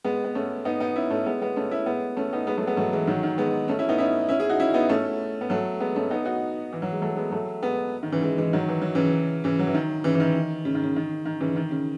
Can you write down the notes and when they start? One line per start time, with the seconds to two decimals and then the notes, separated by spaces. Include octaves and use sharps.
0.04 G#3 B3
0.24 B3
0.35 A3 C#4
0.65 B3 D#4
0.80 B3 D#4
0.96 C#4 E4
1.10 A3 C#4
1.26 G#3 B3
1.41 G#3 B3
1.56 A3 C#4
1.71 C#4 E4
1.86 G#3 B3
2.17 A3 C#4
2.33 B3 D#4
2.47 G#3 B3
2.57 F#3 A3
2.67 G#3 B3
2.77 F#3 A3
2.93 E3 G#3
3.07 D#3 F#3
3.23 D#3
3.38 G#3 B3
3.68 A3 C#4
3.79 C#4 E4
3.89 B3 D#4
3.98 C#4 E4
4.29 C#4 E4
4.39 E4 G#4
4.49 D#4 F#4
4.60 C#4 E4
4.74 B3 D#4
4.89 A3 C#4
5.41 B3
5.50 F#3 A3
5.80 G#3 B3
5.96 A3 C#4
6.10 B3 D#4
6.25 D#4 F#4
6.73 E3
6.82 F#3
6.92 G#3
7.02 F#3 A3
7.17 G#3 B3
7.32 F#3 A3
7.62 G#3 B3
8.03 D#3
8.12 C#3 E3
8.22 E3 G#3
8.38 E3 G#3
8.53 D#3 F#3
8.68 E3
8.82 F#3
8.95 C#3 E3
9.44 C#3 E3
9.59 F#3
9.67 E3
9.74 D#3
10.04 C#3 E3
10.15 E3
10.20 D#3
10.65 C#3
10.75 D#3
10.83 C#3
10.96 D#3
11.26 D#3
11.41 C#3 E3
11.56 D#3
11.71 C#3